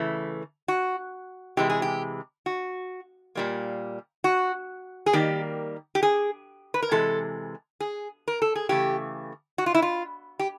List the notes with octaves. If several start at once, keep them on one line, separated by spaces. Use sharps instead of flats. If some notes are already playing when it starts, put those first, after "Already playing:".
Already playing: C#3 E3 A3
F#4
C3 E3 G#3 G4
G#4
G4
F#4
A#2 G3 A#3
F#4
G#4
D#3 G3 A#3 G4
G4
G#4
B4
A#4
C3 E3 G#3 A4
G#4
A#4
A4
G#4
C#3 E3 A3 G4
F#4
F4
E4
F4
G4